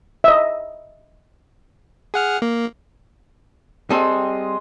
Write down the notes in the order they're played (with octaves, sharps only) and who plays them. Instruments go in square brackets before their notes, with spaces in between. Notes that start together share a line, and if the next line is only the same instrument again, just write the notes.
[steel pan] D#5 E5
[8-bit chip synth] G#4 F#5 F6
A#3
[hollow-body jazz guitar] G3 C4 A4 [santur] G#3 C6 D#6